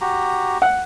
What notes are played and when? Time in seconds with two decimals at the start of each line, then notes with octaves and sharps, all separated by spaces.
0.01 F#4 G4 A#5
0.62 F#5